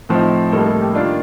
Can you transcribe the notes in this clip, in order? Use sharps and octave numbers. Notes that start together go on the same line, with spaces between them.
A2 F3 C4 D#4
A2 G3 A#3 D#4 A4
A4
G4
D#3 A#3 D4 F4